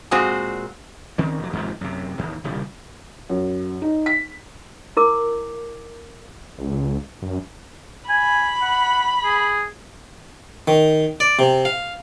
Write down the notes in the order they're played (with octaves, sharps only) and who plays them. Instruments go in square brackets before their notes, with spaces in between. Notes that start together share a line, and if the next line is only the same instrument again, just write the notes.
[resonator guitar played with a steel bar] A#2 G#3 C4 F#4 C5
[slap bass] D#3 C4 C#4
F1 F#3
D#2 G#2 C3 F3
F#2 C3
A1 D#2
D#1 C2 C#3 G3
[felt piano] F#2
D#4
B6
[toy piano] E4 A#4 D6
[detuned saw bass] C#2
F#2
[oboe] G#5 [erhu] B5
[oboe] F#5
G#4
[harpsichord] D#3
D5
C3
F5